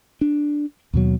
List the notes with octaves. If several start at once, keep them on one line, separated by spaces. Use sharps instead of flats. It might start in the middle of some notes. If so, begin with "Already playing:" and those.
D4
D#2 B2 F#3